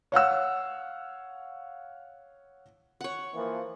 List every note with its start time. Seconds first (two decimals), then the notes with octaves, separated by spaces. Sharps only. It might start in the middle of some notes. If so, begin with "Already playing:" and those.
0.12 C#5 F5 F#5 E6
3.01 C#5 F#5
3.32 E3 F3 A#3